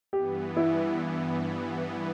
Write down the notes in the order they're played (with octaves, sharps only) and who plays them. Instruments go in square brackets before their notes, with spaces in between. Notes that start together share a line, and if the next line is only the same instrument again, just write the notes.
[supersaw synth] G2 E3 B3 [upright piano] G4
[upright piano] E4